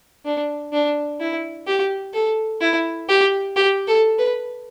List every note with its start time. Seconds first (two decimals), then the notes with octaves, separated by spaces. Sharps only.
0.25 D4
0.72 D4
1.20 E4
1.67 G4
2.13 A4
2.61 E4
3.08 G4
3.56 G4
3.87 A4
4.18 B4